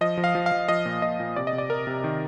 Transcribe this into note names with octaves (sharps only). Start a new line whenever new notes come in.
F3 D#5
F3
F5
F3
F5
F3
F3 D#5
A#2
A#2 D#5
A#2
C3 D5
D#5
C3
D5
C3 A#4
C3
D#3